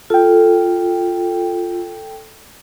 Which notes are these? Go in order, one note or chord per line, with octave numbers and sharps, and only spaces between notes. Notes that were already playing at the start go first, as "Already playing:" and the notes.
F4 A4 G5